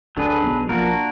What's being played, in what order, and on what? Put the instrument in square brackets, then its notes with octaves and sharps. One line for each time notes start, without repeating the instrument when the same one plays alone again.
[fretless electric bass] D2 D3 [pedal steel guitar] F#3 D4 G#4 B4
[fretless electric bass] B1 B2
[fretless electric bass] A#1 A#2 [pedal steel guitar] A#3 D4 F#4 A#4